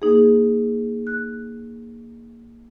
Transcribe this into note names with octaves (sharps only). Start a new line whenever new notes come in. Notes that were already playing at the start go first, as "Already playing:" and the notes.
A#3 D#4 G#4
F#6